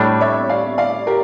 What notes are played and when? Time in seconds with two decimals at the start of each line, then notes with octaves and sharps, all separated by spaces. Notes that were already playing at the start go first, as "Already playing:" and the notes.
Already playing: A2 G3 D4 A4 C#5
0.21 C#5 E5
0.49 D5 F5
0.78 D5 F5
1.07 G4 A#4